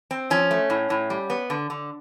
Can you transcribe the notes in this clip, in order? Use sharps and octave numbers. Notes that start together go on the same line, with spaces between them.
C4
F3 C#4
A3
A2
A2
G3
B3
D3
D3